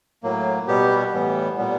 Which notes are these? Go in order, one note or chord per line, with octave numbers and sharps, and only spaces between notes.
A2 F#3 A#3
B2 G3 B3 G4
A2 E3 G3 B3
A#2 G3 B3